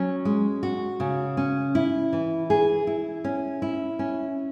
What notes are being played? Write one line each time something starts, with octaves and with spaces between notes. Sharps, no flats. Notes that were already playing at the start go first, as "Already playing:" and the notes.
Already playing: F#3 C#4
G#3
F#4
C#3
C#4
E4
E3
G#4
E4
C#4
E4
C#4